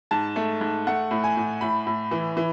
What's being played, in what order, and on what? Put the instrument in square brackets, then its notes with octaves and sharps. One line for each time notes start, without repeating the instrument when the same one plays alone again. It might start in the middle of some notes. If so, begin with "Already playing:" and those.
[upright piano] G#2 A5
A3
G#2
A3 F#5
A2
G#5
A2
A2 B5
A2
E3
E3